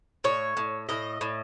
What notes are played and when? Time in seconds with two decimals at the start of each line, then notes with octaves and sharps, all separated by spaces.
0.24 A2 C#5
0.57 A2
0.89 A2 D#5
1.21 A2